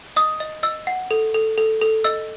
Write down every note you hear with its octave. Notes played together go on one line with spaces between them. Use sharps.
D#5 D#6
D#5
D#5 E6
F#5
A4
A4
A4
A4
D#5 E6